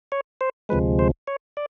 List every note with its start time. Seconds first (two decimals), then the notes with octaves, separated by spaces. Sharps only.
0.12 C#5
0.41 C5
0.69 D2 C3 F3 G#3 B4
0.99 C5
1.27 C#5
1.57 D5